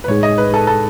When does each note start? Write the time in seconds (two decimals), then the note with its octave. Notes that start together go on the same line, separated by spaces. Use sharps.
0.04 B4
0.08 A2 G#3 D#4 G#4 C#5
0.23 D#5
0.38 B4
0.54 A4
0.67 A4